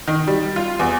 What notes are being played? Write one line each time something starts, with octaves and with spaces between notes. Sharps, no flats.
D#3
G3
F4
E2